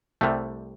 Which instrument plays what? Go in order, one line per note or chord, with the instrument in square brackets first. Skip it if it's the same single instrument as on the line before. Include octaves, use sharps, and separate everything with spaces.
[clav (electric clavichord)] C2 C3 G3 A3